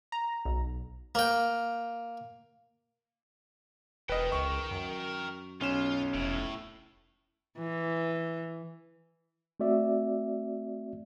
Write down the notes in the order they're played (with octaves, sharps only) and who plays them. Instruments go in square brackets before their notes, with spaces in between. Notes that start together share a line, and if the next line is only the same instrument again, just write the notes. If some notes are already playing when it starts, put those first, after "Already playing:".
[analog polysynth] A#5
B1
[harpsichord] A#3 G5
[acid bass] E1 [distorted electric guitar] A#4 G5 [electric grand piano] B4 D#5
[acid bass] C#2 [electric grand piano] C#6
[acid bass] F#2
[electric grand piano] B1 C#4 E7 [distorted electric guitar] F4
[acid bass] F1 [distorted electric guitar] A2
[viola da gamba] E3
[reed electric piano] A3 C4 F#4 D5 E5